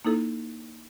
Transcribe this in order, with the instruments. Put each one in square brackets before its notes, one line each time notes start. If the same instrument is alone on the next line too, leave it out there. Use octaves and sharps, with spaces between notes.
[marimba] A#3 D#4 E4 A4